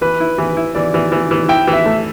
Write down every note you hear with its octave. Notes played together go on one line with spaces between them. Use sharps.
E3 B4
E4
E3
E4
E3 D5
E3
E3
E3
E4 G5
E3
E5
A3